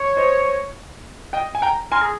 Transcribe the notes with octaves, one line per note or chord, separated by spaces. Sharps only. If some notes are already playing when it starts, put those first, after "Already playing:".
Already playing: C#5
C5 D#5
D#5 G5
G#5
G5 A#5
A#4 G#5 C6
G#4